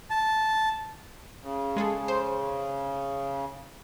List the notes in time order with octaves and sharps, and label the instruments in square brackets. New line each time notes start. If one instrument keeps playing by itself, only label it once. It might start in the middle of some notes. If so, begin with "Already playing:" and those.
[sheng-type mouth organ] A5
[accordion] C#3
[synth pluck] G#3 G#4 A4
C5